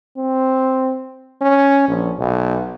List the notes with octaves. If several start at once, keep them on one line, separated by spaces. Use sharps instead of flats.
C4
C#4
A#1
B1